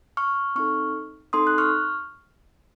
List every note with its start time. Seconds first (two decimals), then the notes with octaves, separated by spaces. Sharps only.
0.17 C#6 F6
0.55 C4 D#4 A4 C#6 F6
1.33 C4 D#4 A4 C6 D#6
1.47 F#6
1.58 C#6 F6